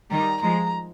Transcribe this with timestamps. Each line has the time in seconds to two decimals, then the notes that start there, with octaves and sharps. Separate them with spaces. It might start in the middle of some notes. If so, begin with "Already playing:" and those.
0.11 D#3 G3 A#5
0.42 F3 G#3 A#5